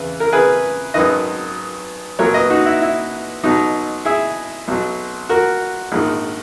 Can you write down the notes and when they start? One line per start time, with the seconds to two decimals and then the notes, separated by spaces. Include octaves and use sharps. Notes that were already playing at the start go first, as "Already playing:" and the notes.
Already playing: E2 C#3 E3 B4
0.20 A#4
0.33 G#4 B4
0.94 G#1 F#2 D#3 B4 D#5
2.19 B1 A#2 F#3 A#4 C#5
2.34 B4 D#5
2.50 D#4 F#4
2.66 E4
2.82 E4
3.44 B1 B2 F#3 D#4
4.05 E4 G#4
4.68 B1 B2 F#3
5.29 F#4 A#4
5.92 A#1 G#2 D#3